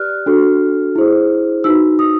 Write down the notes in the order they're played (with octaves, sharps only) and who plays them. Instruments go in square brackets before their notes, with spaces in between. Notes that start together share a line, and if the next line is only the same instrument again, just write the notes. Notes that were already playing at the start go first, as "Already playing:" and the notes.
Already playing: [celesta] G4 B4 D5 F6 F#6
D4 F#4 A4
E4 G#4 C5
D#4 F#4 B4 E6
D#6